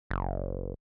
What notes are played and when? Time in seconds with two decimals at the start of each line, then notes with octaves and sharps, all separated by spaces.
0.11 F#1